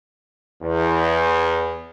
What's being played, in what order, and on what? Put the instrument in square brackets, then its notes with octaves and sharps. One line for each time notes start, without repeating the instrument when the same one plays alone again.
[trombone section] E2